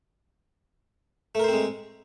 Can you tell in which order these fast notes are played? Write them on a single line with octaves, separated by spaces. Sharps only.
A3 A#4 C5 C4 G#3